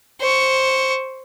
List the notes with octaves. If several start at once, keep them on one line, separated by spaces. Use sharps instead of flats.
C5 C#6